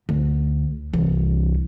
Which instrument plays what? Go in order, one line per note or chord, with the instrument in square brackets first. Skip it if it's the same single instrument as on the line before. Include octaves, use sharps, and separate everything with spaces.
[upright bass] D2
C2 E3